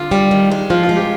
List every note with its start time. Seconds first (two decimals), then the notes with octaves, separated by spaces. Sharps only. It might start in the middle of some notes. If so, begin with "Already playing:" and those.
Already playing: D3 F4
0.11 G3
0.31 D#3
0.51 G#3
0.70 F3 F4
0.83 F4
0.89 G#3
0.96 G4